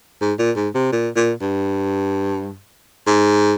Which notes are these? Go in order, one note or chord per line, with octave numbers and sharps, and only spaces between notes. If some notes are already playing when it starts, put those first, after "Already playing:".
G#2
A#2
G#2
C3
A#2
A#2
G2
G#2